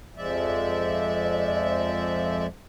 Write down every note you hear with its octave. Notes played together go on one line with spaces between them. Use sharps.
F2 F3 G#3 D5 E5